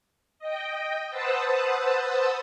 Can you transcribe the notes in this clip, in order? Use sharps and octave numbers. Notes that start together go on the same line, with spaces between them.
D#5 G5
B4 C5 F#5 A5 D#6 E6